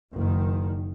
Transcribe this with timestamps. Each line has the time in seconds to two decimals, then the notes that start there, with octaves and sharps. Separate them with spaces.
0.15 F#1 D#3